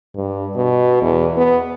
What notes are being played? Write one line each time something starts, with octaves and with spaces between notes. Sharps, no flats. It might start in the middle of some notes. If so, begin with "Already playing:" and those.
G2
B2
E2
B3